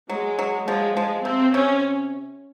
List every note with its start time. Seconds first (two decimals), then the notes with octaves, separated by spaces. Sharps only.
0.10 F#3 G#3
0.39 F#3
0.67 F3 G#3
0.97 F3 G#3
1.25 C3 C4
1.54 C3 C#4